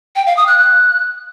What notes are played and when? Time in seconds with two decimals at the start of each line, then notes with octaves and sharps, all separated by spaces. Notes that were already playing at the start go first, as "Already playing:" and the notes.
0.16 G5
0.26 F5
0.37 D#6
0.47 F#6
0.58 F#6